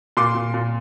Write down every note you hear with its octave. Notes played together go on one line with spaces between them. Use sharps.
A#2 C6 D6
A#2
A#2